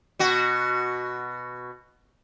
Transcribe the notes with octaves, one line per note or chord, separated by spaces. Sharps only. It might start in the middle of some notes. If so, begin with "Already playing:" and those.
B2 F#4